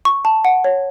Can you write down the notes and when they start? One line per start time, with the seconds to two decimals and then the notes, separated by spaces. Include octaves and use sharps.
0.05 C#6
0.25 A5
0.45 F#5
0.64 C#5